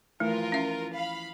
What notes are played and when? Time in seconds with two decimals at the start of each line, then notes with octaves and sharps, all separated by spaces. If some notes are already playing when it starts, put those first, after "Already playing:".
0.20 E3 F3 A3 F4 A#4
0.52 C#4 E5
0.92 F5 B5